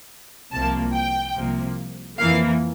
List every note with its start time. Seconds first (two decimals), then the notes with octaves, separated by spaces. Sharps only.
0.52 C2 C3 F3 A#3 A5
0.94 G5
1.36 C2 C3 F3 A#3
2.19 F2 E3 A#3 F5